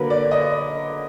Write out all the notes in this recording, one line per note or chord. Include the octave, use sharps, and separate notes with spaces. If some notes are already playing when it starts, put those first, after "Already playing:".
Already playing: D3 F#3 A#3 A#4 B4
D5
D#5